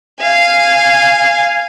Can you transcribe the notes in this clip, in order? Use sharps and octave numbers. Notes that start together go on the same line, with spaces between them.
F5 G#5